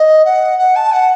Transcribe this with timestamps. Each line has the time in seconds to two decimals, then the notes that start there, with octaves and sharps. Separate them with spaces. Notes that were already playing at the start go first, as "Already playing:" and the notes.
Already playing: D#5
0.25 F#5
0.58 F#5
0.75 A5
0.92 F#5